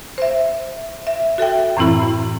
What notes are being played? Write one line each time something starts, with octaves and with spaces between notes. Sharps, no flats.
C5 E5
E5
F#4 A4 E5 G5
F#2 A2 E3 C4 E4 B5